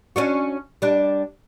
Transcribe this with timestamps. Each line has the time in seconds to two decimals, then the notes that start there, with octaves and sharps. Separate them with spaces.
0.16 C#4 D4 F#4
0.82 G3 D4